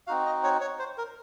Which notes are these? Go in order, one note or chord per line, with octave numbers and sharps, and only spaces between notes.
C4 D#4 F#4 F5
D#5
C#5
C#5
C5
A#4